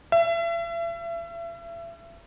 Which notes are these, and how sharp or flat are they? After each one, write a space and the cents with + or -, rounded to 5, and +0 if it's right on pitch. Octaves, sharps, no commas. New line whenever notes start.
E5 +35